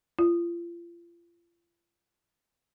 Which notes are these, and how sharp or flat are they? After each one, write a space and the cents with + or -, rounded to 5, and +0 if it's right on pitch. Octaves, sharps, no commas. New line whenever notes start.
F4 -35